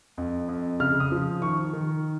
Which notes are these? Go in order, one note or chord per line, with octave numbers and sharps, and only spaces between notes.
F2
F2
C#3 F6
D#6
F3
D#3 C#6
D#3